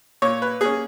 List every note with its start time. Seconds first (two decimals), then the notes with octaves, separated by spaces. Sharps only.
0.22 A#2 C#5
0.42 B4
0.61 A#3 C#4 G#4